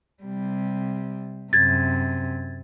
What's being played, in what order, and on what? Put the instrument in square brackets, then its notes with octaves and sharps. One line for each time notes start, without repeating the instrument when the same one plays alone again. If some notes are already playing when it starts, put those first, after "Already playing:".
[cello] C3 G3
[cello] F#2 C3 [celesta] G#6 A6